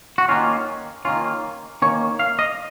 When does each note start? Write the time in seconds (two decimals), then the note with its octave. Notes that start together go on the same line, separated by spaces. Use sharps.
0.18 F#4
0.29 D#3 A#3 C#4 F4
1.05 D#3 A#3 C#4 F4
1.82 D#3 A#3 C#4 C#5
2.19 F5
2.39 D#5